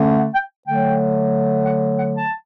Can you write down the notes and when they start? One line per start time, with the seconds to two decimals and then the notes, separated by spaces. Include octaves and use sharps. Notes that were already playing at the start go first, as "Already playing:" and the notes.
Already playing: D3 A3 C#4
0.18 F#5
0.34 G5
0.67 D3 F#3 A3 G5
1.66 F#5
1.99 F#5
2.16 A5